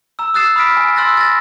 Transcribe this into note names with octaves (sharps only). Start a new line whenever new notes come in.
A#5 E6
D#6 E6 F#6 A6 C7 E7
B5 D#6 F6 B6 D7
G#5
C6 E6 F#6 A6 A#6
A6 A#6